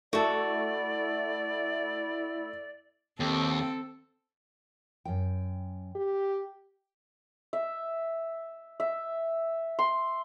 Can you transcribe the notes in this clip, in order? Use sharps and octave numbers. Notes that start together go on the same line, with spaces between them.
A3 E4 F#4 A4 D5
D#2 C4 A4
F#2 G5
G4
E5
E5
C6